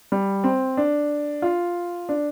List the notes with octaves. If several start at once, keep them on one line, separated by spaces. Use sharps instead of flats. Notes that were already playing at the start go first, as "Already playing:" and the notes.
G3
C4
D4
F4
D4